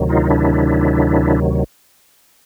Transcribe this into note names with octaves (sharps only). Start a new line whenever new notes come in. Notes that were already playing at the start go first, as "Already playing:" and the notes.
Already playing: D2 C3 D#3 F#3
D#4 F4
D4 E4